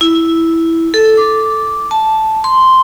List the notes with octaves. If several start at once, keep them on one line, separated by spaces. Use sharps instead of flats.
E4
A4
D6
A5
C6